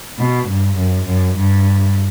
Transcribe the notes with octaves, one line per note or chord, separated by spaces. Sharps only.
B2
G2
F#2
F#2
G2